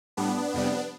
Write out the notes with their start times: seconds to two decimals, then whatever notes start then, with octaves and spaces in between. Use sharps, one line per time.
0.17 A2 G3 B3 D4
0.54 F2 C3 G3